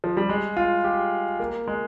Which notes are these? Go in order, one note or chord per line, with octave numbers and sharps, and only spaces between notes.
F3
G3
G#3
F4
G4
A#3
G#3